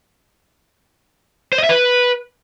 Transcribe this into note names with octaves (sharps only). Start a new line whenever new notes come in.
C5
D#5
E5
B4